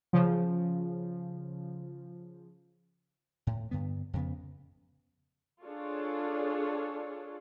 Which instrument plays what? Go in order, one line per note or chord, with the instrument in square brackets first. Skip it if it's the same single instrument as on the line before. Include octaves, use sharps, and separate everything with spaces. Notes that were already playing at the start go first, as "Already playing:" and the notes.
[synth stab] C#3 F3
[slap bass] A2
G2 D3 B3
F2 C#3 B3
[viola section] D4 F4 G#4 A4 C#5